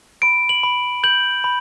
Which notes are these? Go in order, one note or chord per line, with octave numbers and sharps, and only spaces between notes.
B5 D7
F#7
B5
G6 F#7
B5